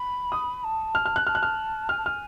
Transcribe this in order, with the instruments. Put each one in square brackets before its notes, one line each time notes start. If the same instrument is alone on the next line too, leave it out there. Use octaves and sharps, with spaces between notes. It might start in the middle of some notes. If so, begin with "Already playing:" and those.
Already playing: [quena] B5
[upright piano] D#6
[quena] A5
[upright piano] F6
F6
F#6
[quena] A5 [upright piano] F6
[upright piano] F#6
F6
[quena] G#5 [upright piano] F6
[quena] A5
[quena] G#5 [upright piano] F6